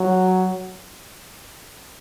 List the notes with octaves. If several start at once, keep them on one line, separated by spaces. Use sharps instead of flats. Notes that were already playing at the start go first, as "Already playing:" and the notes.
Already playing: F#3